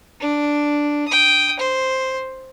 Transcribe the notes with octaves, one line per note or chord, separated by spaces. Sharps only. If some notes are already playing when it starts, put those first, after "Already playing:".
D4
G5 D#6
C5